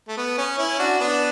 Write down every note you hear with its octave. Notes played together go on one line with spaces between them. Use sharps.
A3
B3
C#4
C#4 E4
D4 F#4
B3 D4